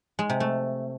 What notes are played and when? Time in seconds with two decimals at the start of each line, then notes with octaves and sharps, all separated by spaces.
0.19 G#3
0.30 C3
0.40 A3